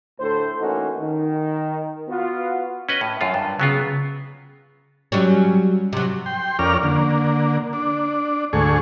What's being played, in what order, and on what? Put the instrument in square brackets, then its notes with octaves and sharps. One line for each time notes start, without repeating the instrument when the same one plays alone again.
[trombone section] D2 A2 A4 C5
E3 A3 A#3 C#4 D#4 F#4
D#3
B3 F4 F#4
[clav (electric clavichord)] C#4 B4 D#5
A2
F#2 F4
G2
[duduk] C#3 [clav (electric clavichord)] F#3 B3 F4
[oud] F#3 G3 C#4
C3 F#3
[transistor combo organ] G5 C6
F2 C#4 A#4 D5 F6
D3 A#3
D4
D2 G#2 A3 G#4 C#6